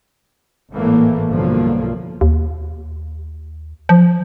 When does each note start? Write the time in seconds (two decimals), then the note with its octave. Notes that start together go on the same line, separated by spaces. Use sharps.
0.71 G#1 A2 E3 A3 A#3
1.29 B1 G2 D3 F3 A#3
2.21 D#2
3.89 F3